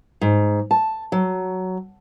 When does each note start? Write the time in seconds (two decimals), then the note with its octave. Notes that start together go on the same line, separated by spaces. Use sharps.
0.21 G#2
0.71 A5
1.12 F#3